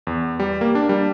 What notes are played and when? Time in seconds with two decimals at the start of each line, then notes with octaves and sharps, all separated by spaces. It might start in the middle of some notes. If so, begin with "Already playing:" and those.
0.07 E2
0.40 G3
0.61 A#3
0.75 D4
0.89 G3